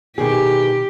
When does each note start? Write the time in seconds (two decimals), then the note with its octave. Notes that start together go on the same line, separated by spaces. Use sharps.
0.18 B2 D#3 G4 G#4